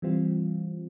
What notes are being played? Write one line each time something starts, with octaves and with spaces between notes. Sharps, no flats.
E3 G3 C4 F4